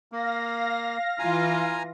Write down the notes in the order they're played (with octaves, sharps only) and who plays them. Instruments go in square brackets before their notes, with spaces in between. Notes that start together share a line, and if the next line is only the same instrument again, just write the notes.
[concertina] A#3 [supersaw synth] F5 A#6
[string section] E3 F4 [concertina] G#5 A#5